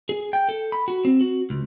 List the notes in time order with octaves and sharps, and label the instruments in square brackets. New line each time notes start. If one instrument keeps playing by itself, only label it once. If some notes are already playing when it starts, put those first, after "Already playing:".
[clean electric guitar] G#4
G5
A4
B5
F#4
C4
F#4
C#2